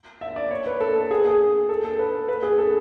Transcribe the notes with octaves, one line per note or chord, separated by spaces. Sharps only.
E5
D5
C#5
B4
A4
A4
G#4
G#4
A4
A4
B4
B4
G#4
A4